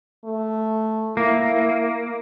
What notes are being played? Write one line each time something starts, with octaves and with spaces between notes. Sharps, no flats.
A3
A#3 E4